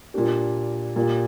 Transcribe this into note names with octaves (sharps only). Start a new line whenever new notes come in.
A#2 A#3 D4 G4
A#2 A#3 G4